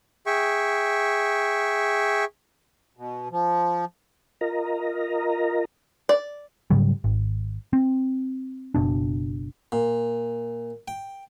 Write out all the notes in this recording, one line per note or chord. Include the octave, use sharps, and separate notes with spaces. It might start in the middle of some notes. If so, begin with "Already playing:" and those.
G#4 E5 G5 C#6
B2
F3
F4 A#4 D#5 A#5
D5
G#2 C#3 F#3 G3
G#1
C4
F#1 B2 D4
A#2
G5